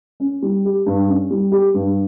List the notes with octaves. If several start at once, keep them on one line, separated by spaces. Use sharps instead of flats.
C#4
G3
G4
G2
C#4
G3
G4
G2